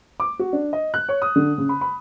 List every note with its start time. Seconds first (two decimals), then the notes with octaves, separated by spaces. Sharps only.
0.20 D6
0.39 F#4
0.53 D4
0.73 D#5
0.94 F#6
1.09 C#5
1.22 D#6
1.36 D3
1.58 C#3
1.69 B5
1.81 B5